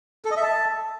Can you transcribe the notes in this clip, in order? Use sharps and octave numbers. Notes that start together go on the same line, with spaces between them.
A4
D#5
E5
A5